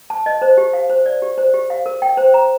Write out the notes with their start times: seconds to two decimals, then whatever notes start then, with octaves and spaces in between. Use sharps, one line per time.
0.10 A5
0.26 D#5
0.42 C5
0.57 G4
0.73 F5
0.89 C5
1.06 D5
1.22 G4
1.38 C5
1.54 G4
1.70 F5
1.86 A#4
2.02 G5
2.17 C5
2.34 A#5